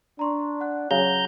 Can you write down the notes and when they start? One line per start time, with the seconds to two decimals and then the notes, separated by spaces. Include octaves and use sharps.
0.19 D4 A#5 C6 C#6
0.61 F#5 F#6
0.91 C#3 F#3 A#5 G6